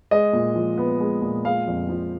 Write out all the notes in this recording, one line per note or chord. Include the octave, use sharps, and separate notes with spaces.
G#3 D#5
A#2
F3
B3
G#3
A#2
G#3 F5
F2
F3